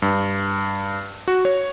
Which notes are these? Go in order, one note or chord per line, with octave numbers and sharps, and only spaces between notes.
G2
F#4
C#5